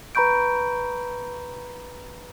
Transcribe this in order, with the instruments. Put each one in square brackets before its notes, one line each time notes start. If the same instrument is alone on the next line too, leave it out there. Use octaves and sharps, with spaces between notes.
[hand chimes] B4 A#5 B5 C#6 G6 D7